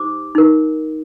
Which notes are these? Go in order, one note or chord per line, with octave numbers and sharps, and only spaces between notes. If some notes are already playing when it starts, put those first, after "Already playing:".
Already playing: D#4 G4 C5 D6
D#4 A#4